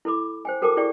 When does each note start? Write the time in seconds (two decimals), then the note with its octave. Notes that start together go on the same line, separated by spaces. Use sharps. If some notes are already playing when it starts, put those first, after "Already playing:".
0.05 E4 A4 B5 D6
0.45 C5 G5 G#5
0.62 F#4 A4 A#4 G5 A5 D6
0.77 E4 G#4 D5 G5 C#6